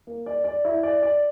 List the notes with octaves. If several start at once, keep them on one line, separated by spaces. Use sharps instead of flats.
A#3
D5
D5
E4
D5
D5